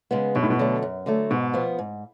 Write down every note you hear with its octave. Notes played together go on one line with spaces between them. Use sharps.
C#3 G#3 B3
F#2 B2
A2
B2
D3 F#3 A3
F#2
D3 F#3 A3
G#2 B2
F3 B3
G#2